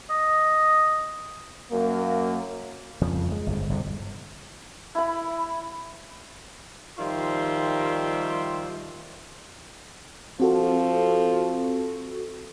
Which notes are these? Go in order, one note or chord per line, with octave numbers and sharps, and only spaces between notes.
D#5
F#2 A#3
F2 C#3 F3
G#3
G1 F2
G1 E2 C3
E4 B5
D#3 F3 G3 F4 E5 C6
F3 C4 F#4 A4